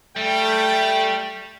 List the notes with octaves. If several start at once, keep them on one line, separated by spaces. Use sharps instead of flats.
G3 A3 G5